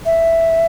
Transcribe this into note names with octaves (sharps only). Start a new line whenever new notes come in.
E5